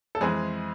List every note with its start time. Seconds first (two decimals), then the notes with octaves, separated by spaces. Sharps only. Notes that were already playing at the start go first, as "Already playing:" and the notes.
0.15 A4
0.21 F2 E3 G#3 C4 G#4